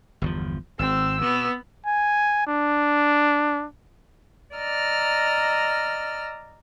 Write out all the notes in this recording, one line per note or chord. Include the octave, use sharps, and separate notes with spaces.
G1 E2 F3
G#1 C4 E6
B2 B3
G#5
D4
D5 D#5 A#5 E6 F6